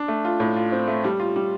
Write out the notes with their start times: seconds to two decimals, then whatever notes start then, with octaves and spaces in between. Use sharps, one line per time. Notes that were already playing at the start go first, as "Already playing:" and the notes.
Already playing: D4
0.08 A3
0.25 F4
0.40 A2
0.57 F4
0.72 C4
0.88 A3
1.04 G3
1.20 F4
1.36 G3